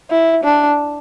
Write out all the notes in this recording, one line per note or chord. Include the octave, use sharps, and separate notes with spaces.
E4
D4